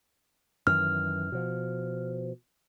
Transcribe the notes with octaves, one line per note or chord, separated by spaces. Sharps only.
F#2 D#3 E3 F6
B2 F3